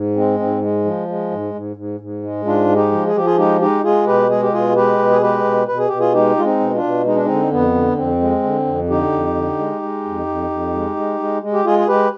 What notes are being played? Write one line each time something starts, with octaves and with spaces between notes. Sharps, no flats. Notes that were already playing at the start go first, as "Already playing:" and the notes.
Already playing: G#2
G#3 C4
G#2 C4
G#3
F3
G#3
G#2
G#2
G#2
G#2
G#3
G#2 D4 F4
G#3
D#4 G4
F3
G#4
F3 G4
F4 G#4
G#3 D#4 G4
G#3 D#4 G4
G#3 F4 G#4
B2 G4 B4
G#3 G#4
G4
B2 F4 G#4
G#3 G4 B4
B2
G#4
G#3 G4 B4
B2
B2 B4
G#4
B2 G4
F4 G#4
G#3 D#4 G4
G#3 F4
C4 D#4
B2
D4 F4
B2
G#3 D#4
D4
D3 C4 D#4
F2 B3
D3
F2 C4
G#3
D3
F2
D3 D#4 G4
F2
D3
G#3
G#3
F2
F2
F2
G#3
G#3
G#3
G#3
G4
G#3 F4 G#4
G#4
G#3 G4 B4